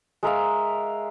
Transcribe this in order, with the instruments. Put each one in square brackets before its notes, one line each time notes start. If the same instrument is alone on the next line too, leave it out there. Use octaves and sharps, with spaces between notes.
[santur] G#3 A#4 E5 F5